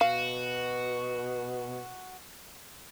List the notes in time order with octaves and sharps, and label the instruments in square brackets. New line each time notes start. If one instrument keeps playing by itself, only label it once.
[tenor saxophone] B2 [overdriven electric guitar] F#4 [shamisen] F5